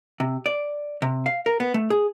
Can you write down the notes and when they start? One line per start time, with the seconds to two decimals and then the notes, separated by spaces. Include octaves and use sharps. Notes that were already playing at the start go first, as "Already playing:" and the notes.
0.20 C3
0.46 D5
1.02 C3
1.26 F5
1.46 A#4
1.60 B3
1.74 A3
1.90 G#4